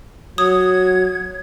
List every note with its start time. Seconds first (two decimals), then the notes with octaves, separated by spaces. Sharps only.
0.38 F#3 D#6 G#6